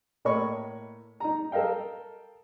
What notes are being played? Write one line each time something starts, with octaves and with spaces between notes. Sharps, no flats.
A2 A#3 C#5 D#5 B5 C#6
D#4 A#5
A4 A#4 D#5 F5 G5